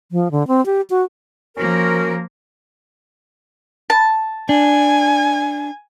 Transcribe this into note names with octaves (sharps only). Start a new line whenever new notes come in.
F3
D3
C4
G4
F#4
F3 A#3 C#4 F#4 A#4
A5
D4 G#5